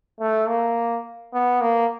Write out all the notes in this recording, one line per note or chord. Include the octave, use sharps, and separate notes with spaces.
A3
A#3
B3
A#3